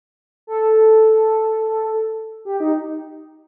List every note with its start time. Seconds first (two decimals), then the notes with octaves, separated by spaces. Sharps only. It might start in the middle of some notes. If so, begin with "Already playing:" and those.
0.47 A4
2.45 G4
2.60 D#4